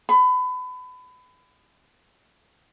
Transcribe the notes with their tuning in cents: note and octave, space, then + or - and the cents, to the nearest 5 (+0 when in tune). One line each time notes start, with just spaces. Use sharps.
B5 +30